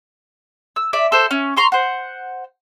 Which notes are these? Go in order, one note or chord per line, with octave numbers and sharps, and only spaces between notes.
E6
D5 E5
A4 C5
C#4
A#5 C6 C#6
C5 F#5